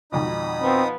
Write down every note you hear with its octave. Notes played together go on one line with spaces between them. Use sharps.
G#1 F2 B2 D#4 B5 D#6
F3 B3 C4